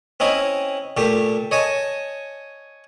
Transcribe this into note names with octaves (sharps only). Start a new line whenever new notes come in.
C4 C#4 E4 D#5
A#2 A3 G4
C#5 D#5 G#5 A5